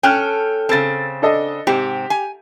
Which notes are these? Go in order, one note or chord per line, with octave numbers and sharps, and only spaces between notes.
C#4 A4 G5 F6 F#6
C#3 C4 A4 A6
D4 A4 D#5
G#2 C3 C4 G4
G#5